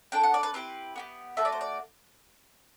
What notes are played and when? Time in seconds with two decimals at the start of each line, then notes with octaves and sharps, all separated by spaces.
0.12 D4 A4 G5
0.23 F#5
0.34 D5
0.43 B4
0.54 C4 E4 G4 B4
0.96 B3 E4 G4
1.37 A3 D4 F#4 A4 E5
1.45 D5
1.52 C5
1.61 D5